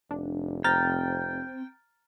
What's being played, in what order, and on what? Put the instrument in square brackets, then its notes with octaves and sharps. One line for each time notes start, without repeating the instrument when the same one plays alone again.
[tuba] F1 [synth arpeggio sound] D4
[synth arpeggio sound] C4 [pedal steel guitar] G5 [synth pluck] A#5 F6 A6